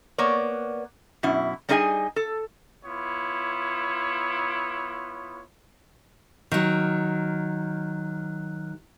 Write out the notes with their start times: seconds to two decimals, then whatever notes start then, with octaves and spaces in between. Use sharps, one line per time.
0.18 A#3 B3 C#5 D5
1.23 F#2 B2 E4
1.69 G3 D4 D#4 G#4 D#5 G#5
2.16 A4
2.84 B3 E4 F4 C#5
6.52 D#3 F#3